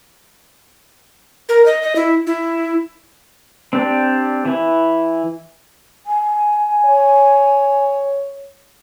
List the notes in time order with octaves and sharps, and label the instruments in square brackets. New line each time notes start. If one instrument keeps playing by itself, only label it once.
[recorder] A#4
D#5
D#5
E4
E4
[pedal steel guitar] C4 D4 G4 D5
E3 E4
[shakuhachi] G#5
[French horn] C#5